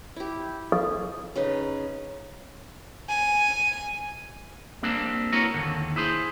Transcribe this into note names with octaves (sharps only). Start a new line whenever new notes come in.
E4 G4
A4
C#3 D#4 B4
G#5
G3 A#3 C4 D4
E4 F#4 A#4 B4 C#5
D#2 B2 D3
E4 G#4 C5